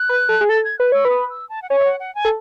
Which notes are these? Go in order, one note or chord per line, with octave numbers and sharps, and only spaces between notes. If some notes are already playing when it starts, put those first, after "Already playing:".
Already playing: F#6
B4
A4
G#4
A4 A6
G#6
B4 F#6
C#5 E6
B4 D#6
E6
A5
F#5
C#5 G#5
E5
F#5
F#5
G#5
A4